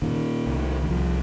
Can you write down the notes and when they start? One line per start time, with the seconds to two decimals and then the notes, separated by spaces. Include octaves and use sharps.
0.02 A#2 D#3
0.46 C2
0.83 D#3
0.90 C2 F3